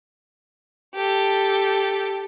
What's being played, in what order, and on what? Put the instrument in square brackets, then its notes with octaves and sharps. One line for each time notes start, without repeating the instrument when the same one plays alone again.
[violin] G4 A4